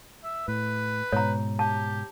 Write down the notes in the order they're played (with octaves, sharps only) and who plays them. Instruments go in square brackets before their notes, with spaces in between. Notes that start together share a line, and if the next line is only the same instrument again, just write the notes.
[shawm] E5
[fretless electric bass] A2 [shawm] B4
[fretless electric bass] G#2 B2 [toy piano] C#5 A#5
[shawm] G4 [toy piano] A5